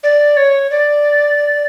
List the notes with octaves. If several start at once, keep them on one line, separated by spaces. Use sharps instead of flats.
D5
C#5
D5